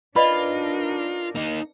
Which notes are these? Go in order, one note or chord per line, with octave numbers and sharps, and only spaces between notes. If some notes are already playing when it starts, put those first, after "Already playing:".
D4 D#4 F4 A#4 B4 D5 D#5 B5
A#3 D#4